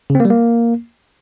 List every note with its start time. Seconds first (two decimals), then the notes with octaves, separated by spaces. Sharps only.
0.10 C#3
0.15 C4
0.20 A#3
0.25 G3
0.30 A#3